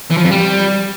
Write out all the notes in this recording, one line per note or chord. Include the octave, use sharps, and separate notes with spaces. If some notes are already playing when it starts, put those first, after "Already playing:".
E3
F3
F2
G3